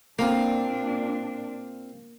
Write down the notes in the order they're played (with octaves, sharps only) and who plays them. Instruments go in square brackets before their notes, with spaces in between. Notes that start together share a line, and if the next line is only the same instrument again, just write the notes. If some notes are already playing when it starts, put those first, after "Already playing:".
[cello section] A#2 D4 [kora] A#3 [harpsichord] C4 F4